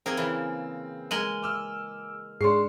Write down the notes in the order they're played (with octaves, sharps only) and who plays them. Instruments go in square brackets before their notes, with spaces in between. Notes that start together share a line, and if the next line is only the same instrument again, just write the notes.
[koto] A#3 G#4 A#4 [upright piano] C4
[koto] C#3 E3
[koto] G#3 A#4 G#5 [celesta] D#7 F#7 G7
[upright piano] D6 E6 F6
[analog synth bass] G#2 [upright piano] D4 C#6 C7 [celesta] G#4 C6